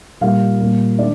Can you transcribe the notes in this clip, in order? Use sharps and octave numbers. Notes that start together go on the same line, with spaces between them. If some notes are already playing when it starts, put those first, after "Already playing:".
A#2 G3 A#3 D#4 F5
A#2 G3 A#3
D#3 G#3 D4 D5